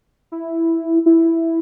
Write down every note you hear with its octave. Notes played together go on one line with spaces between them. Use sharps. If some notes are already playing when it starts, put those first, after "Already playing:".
E4
E4